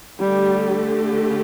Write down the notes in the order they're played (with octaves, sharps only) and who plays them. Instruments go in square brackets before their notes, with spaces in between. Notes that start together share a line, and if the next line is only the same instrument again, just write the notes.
[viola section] D3 A3 G4 [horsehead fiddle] G3